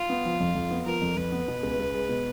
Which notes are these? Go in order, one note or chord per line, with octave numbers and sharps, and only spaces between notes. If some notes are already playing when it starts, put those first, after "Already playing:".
Already playing: F4
B3
F3
F2
F2
B3
F3 A#4
F2
F2 B4
B3
B2
C#2
C#2
G#3
B2